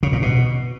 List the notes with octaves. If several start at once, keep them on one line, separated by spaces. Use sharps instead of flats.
C#3
A#2
B2